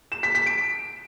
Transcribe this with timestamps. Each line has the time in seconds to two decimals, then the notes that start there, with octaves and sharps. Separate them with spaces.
0.12 E7
0.23 B6
0.35 B6
0.46 D7